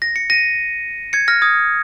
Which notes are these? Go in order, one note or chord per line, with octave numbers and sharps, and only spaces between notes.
A#6
C#7
A#6 D#7
G#6 C#7
F6 A#6
D#6 G#6